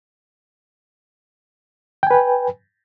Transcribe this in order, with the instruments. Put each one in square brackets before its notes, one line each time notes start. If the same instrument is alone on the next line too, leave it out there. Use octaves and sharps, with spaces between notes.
[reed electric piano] G5
G#5
B4